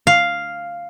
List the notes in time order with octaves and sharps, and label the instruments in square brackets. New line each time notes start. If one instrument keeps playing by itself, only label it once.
[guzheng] F5